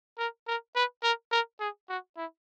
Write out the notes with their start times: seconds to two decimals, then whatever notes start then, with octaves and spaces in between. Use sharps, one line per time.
0.18 A#4
0.47 A#4
0.75 B4
1.03 A#4
1.32 A#4
1.60 G#4
1.89 F#4
2.17 E4